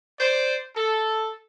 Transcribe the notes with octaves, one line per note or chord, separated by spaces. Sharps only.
C5 D5
A4